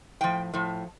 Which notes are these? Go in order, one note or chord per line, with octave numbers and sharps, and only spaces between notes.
A2 F3 G5
A2 F3